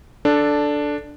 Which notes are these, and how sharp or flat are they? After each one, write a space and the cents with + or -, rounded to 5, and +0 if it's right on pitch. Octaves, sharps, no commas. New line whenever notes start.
D4 +0 A4 -5